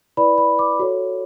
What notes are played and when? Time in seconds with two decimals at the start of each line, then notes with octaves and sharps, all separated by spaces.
0.17 E4 B4 D5 B5
0.38 B5
0.59 D6
0.79 F#4 A4 C#5